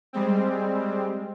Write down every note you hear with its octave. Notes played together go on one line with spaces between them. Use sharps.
G3 G#3 C4